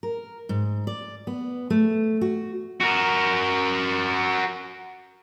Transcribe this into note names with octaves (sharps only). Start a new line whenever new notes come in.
A#4
G#2
D5
B3
A3
F#4
F#4 A#4